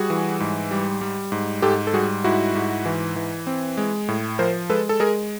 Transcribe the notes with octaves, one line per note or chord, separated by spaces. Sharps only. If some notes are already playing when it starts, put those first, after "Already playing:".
Already playing: G3 F#4 G#4
E3
G#2
G3
G3
G#2
G#2 G4 A4
A4
G3 F#4 G#4
G#2 E4 F#4
G#2
E3
E3
C4
G#3
A2
F3 A#4 C5
G#3 A4 B4
A4
G#3 G#4 A#4